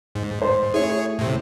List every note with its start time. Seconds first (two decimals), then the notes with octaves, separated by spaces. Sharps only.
0.15 G#2
0.42 C5
0.74 A3 E4 G#4 C#5
1.19 A2 C3